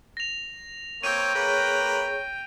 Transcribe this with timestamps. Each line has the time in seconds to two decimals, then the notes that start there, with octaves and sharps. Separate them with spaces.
0.17 A#6 F7
1.03 A#3 C4 C#5 G5 D#7
1.35 A#3 G#4 A#4 B4 C#5 C#6